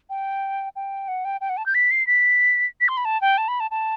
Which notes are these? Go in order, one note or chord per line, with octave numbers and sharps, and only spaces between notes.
G5
G5
F#5
G5
G5
F#5
A5
G6
B6
C7
B6
B6
C6
B5
A5
G5
A5
B5
A5
A5